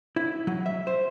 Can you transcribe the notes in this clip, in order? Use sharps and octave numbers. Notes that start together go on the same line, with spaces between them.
E4
F#3
E5
C5